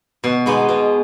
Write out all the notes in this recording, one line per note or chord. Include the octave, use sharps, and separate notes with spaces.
B2
G#3 B3 D#4
B2